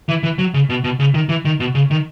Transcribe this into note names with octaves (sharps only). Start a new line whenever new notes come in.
E3
E3
F#3
C#3
B2
B2
C#3
D#3
E3
D#3
B2
C#3
D#3